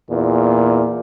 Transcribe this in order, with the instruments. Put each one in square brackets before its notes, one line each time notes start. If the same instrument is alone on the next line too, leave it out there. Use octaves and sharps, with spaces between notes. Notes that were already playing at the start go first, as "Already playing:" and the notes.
[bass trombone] E2 [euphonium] A#2